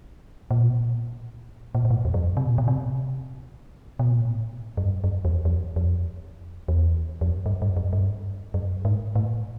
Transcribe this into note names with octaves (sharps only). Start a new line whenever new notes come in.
A#2
B2
A#2
A#2
A#2
A2
E2
F#2
F2
C3
B2
A#2
B2
C3
B2
A#2
A2
F#2
G2
F#2
E2
F2
F2
E2
F2
F#2
G2
G2
F#2
G2
F#2
G#2
A2